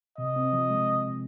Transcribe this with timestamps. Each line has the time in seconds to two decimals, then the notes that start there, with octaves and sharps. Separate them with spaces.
0.18 C3 D#5
0.36 C4
0.53 F3
0.70 G#3